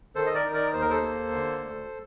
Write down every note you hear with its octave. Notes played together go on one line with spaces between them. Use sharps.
D#3 A4 C5
D#5
A#4 D5
D#4
A#4 D5
D#2 C5
A#4
A4 C5
A#3
D3
D2